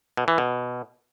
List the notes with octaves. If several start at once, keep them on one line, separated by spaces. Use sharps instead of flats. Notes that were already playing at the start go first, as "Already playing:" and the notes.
B2
E3
B2